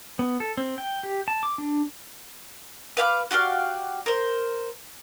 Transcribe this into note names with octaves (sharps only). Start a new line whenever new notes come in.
B3
A4
C4
G5
G4
A5
D6
D4
B4 F5 G5 D6
F#4 G4 D5 F5
A#4 C5